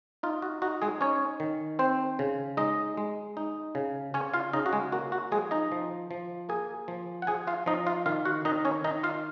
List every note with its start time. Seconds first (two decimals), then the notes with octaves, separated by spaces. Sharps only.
0.23 D#4 F4
0.42 F#4
0.62 D#4 F#4
0.82 G#3 G#4
1.01 C#4 D#4 C#5
1.40 D#3
1.79 C4 C5
2.19 C#3
2.57 G#3 D#4 D#5
2.97 G#3
3.37 D#4
3.75 C#3
4.14 C#3 C#4 C#5
4.34 F4 F5
4.53 C#3 D#4 D#5
4.66 F#4
4.73 G#3 G#4
4.92 A#3 F#4
5.12 F#4
5.31 F3 G#3 G#4
5.51 D#4 D#5
5.72 F3
6.11 F3
6.49 A#3 G#4 G#5
6.88 F3
7.22 F#5
7.27 F3 G#4 G#5
7.47 F4 F5
7.66 F3 D#4 D#5
7.86 F4 F5
8.06 D#3 F4 F5
8.25 F#4 F#5
8.45 D#3 D#4 D#5
8.65 C#4 C#5
8.84 D#3 D#4 D#5
9.03 F4 F5